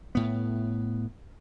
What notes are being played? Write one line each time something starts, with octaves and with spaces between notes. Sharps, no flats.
A2 B3